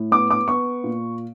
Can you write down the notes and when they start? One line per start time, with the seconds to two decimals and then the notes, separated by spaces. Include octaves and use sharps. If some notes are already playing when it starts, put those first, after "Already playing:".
Already playing: A2
0.12 B3 D6
0.31 D6
0.48 B3 C#6
0.84 A#2